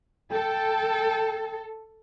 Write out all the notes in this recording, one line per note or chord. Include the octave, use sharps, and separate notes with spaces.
A4 G5